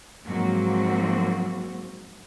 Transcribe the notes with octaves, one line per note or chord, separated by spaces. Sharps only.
G#2 F3 F#3 A#3 C4 F#4